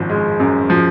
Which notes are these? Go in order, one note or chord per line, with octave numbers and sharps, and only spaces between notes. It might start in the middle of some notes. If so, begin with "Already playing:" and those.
Already playing: G#1 F#2 F3
G#3
F#2
F3